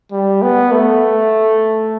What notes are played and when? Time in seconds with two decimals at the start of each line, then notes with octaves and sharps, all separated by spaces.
0.12 G3
0.42 B3
0.71 A3